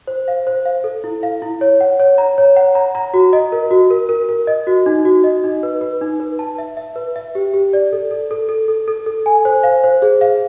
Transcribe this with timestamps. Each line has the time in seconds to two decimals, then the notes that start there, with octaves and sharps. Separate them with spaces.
0.07 C5
0.28 F5
0.47 C5
0.66 F5
0.84 A4
1.04 E4
1.23 F5
1.42 E4
1.61 C#5
1.81 F#5
2.00 C#5
2.18 A#5
2.38 C#5
2.56 F#5
2.75 A#5
2.95 A#5
3.14 F#4
3.33 D#5
3.52 A#4
3.71 F#4
3.90 A#4
4.09 A#4
4.29 A#4
4.47 D#5
4.67 F#4
4.86 D#4
5.05 F#4
5.24 D#5
5.44 D#4
5.63 B4
5.81 B4
6.01 D#4
6.20 B4
6.39 A5
6.58 E5
6.77 E5
6.96 B4
7.16 E5
7.35 G4
7.54 G4
7.73 D5
7.93 A4
8.11 A4
8.31 A4
8.49 A4
8.68 A4
8.88 A4
9.06 A4
9.26 G#5
9.45 C5
9.63 F5
9.84 C5
10.02 G#4
10.21 F5